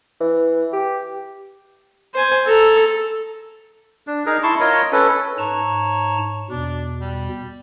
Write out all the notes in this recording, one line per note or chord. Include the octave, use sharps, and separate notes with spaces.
E3
G4
C5 G#5
A4 A#5
D4
D#4 G#4 A#4
E4 A5 C6 C#6
F4 A#4 C#5 D#5
C#4 A4 B4
G#2 C#5 A5 A#5
E2 B2 D4
G3